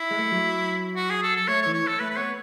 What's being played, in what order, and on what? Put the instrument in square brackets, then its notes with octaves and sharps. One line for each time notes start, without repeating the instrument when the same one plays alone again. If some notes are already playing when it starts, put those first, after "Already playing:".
Already playing: [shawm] E4
[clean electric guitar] G#3
A3
F#3
[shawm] F#4
G#4
A4
A4
[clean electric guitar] A3 [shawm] C#5
[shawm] C#5
[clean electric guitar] E3
[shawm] C#5
A4
[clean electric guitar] A3 [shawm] B4
[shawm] B4
[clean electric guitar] B3 [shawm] C#5